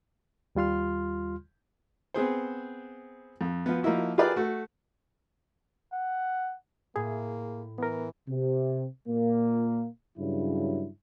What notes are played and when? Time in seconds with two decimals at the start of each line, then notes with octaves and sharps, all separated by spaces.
0.55 D#2 G3 F4 C6 F6
2.14 B3 C4 G#4 C5
3.41 F2
3.66 F3 B3
3.83 F3 A#3 D#4 E4 F#4
4.18 F4 G4 G#4 A#4 B4 D5
4.36 A3 F#4
5.93 F#5
6.96 A2 A#3 G#4
7.78 E3 B3 A#4
8.29 C3
9.08 A#2 A#3
10.17 G2 C#3 F#3 E4